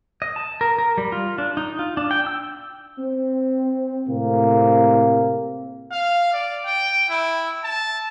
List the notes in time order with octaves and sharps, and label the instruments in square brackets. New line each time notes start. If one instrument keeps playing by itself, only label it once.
[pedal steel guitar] D#5
A5
A#4
A#4
G3
F4
D4
D#4
F4
D4
G5
E6
[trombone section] C4
A2 C3 A#3 C4
[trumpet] F5
D5
G5
E4
A5